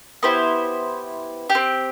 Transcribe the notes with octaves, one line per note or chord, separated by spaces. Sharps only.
B3 E4 G4 C5
G4
C4